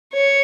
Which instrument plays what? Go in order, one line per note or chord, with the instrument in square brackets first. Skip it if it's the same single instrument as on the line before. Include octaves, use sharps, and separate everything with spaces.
[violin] C#5